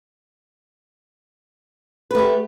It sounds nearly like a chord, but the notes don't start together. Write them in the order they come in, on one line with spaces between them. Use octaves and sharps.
B4 A3 G4